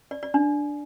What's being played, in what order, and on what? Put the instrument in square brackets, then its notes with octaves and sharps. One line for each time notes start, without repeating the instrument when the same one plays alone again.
[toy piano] D5
D5
D4